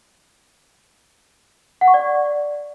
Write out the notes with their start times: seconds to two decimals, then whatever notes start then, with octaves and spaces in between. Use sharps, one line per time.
1.81 F#5
1.88 C#6
1.94 D5